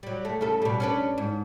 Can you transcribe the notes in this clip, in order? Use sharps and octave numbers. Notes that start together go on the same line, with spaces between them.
F#3 G3
A3
C#3 A4
B2 G3
C#4 D4 B4
G#2